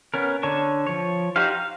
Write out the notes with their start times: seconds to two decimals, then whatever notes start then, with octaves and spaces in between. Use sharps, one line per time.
0.14 B3 C#4 A#4
0.43 D3 C#5 A5 C#6
0.87 F3 C#5
1.36 D#4 F#4 G4 C5 F5
1.52 F5